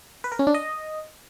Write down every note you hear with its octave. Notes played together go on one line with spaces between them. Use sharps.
B4
A#4
C#4
D4
D#5